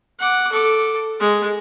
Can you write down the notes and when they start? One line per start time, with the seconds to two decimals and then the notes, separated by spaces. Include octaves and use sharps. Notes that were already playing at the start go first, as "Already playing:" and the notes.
0.19 F#5 D6
0.52 A4 D6
1.20 G#3